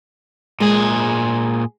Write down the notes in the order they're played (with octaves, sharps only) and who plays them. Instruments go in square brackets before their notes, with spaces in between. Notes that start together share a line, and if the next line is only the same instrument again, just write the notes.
[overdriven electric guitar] A#2 G#4 [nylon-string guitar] G#3